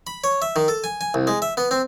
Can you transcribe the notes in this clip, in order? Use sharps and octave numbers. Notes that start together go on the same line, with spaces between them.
B5
C#5
E5
D#3
A4
G#5
G#5
C2
G#3
E5
B3
C4